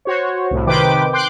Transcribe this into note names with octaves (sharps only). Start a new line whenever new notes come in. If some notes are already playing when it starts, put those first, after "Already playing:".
F#4 C5 C#5
C2 A2
C3 D#3 B4 C5 G5 D6
G5 C6 D6 F#6